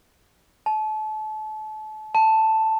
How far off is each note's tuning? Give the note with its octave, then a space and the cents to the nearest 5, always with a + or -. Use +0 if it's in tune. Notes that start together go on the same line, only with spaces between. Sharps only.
A5 -30
A5 +5